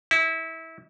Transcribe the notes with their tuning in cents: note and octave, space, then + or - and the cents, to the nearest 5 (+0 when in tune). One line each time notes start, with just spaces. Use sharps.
E4 -25